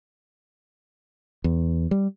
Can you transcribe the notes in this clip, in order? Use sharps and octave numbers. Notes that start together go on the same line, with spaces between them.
E2
G3